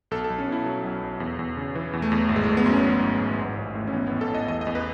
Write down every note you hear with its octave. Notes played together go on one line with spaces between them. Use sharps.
B1 A4
A4
B1
C#4
B2 E4
F#3
B1
B1
E2
E2
C#3
E3
E2
A3
E2
G#1
G#3
A3
G#1
B3
F#2 C#4
E3
G#1
G#1
A1
A1
A2
C#4
E3 B3
B3
A1
A4
A1
D#5
E2 D#5
D#5
E2
B4